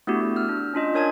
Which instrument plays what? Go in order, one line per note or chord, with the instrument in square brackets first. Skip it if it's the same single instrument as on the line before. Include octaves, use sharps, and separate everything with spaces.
[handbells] A3 B3 D4 E4 F#4 G4
F#4
E6 F6
D4
C#4 D4 F4 D#5
D4 A#4 C#5 G#5 A5 G#6